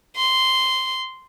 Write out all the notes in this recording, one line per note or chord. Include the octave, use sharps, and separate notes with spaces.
C6